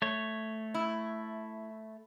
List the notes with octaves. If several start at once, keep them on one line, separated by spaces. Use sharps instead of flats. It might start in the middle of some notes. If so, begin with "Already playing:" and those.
A3 C#5
E4